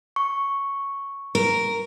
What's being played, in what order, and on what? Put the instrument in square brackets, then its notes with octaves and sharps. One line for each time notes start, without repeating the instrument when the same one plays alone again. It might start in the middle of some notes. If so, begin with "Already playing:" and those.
[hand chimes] C#6
[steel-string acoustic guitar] A#4